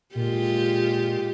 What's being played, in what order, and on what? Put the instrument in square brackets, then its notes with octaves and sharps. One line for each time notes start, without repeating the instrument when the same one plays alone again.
[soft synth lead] A#2 [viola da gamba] G#3 F4 G4